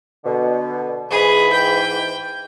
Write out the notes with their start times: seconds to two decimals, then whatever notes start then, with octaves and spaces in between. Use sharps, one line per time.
0.25 B2 D3
1.11 G#2 E3 G#4 B5
1.52 G5